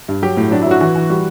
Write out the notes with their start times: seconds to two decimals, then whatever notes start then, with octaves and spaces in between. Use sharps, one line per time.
0.08 G2
0.22 F#3 G4
0.37 A2
0.51 F#3 D4
0.62 E4
0.66 F#3 F#4
0.81 E3 F#4
0.96 E3
1.10 G3 F#4